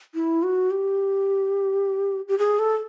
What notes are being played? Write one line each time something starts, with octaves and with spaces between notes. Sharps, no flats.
E4
F#4
G4
G4
G#4
A4